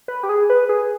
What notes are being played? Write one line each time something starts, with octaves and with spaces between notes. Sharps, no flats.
B4
G4
G#4
B4
G#4